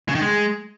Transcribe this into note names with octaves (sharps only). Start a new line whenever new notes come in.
C#3
D#3
G#3